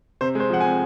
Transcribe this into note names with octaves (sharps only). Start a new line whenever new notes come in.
C3 C5
G#3 C5
F3 F#5
C4 G#5